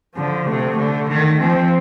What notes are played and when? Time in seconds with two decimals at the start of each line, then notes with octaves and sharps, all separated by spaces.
0.16 D3 F3
0.47 C3 A3
0.78 D3 A3
1.09 D#3
1.40 F3 C4